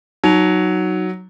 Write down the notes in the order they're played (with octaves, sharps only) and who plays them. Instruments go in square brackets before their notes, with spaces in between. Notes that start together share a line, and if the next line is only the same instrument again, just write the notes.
[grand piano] F#3 [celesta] D#4 F7